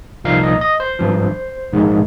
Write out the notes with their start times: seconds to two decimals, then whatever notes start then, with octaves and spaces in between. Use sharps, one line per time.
0.24 C2 A#2 F3 A#3 D#4 F5
0.43 D#5
0.61 D#5
0.80 C5
0.99 G#1 G2 F3
1.73 A#1 G#2 D#3 G#3